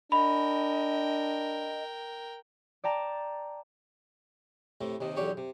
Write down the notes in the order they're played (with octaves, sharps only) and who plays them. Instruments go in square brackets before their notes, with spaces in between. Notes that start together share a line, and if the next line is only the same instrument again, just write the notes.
[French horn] D4 [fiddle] A#4 G5 [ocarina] D#5 [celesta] B5
[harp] D5 G5 A5 A#5
[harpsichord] A2 C3 A3
D#2 C3 D#3
B1 E2 D3 G4 C#5
C3